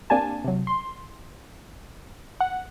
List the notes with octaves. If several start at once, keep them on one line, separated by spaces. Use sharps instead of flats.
A#3 C4 D4 G4 G#5 A5
C3 F#3
C6
F#5